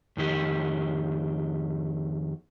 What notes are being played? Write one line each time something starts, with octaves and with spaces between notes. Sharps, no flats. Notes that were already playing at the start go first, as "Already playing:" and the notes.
F2 D#3 G4